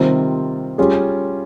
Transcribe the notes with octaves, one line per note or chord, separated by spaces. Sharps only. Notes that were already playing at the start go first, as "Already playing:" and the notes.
Already playing: C3 D#3 G3 C4 F4
G3 C#4 F4 G#4